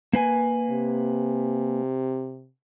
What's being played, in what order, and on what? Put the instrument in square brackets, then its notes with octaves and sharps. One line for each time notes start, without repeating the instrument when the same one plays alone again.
[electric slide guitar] A#3 B4 G#5
[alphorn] C3